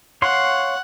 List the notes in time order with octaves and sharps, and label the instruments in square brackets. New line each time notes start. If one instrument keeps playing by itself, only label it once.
[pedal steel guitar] C#5 F5 C6 [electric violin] F#5